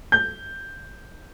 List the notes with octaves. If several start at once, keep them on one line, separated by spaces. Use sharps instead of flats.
G6